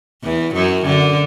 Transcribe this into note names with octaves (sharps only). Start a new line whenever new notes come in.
E2 E3
F#2 F#3
D3